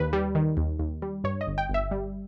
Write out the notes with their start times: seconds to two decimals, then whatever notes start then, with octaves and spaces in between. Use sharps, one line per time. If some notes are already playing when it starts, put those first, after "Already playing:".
Already playing: D#2 B4
0.13 G3
0.35 D#3
0.57 D#2
0.79 D#2
1.02 G3
1.24 G2 C#5
1.41 D#5
1.47 G1
1.58 G5
1.69 G1 E5
1.91 G3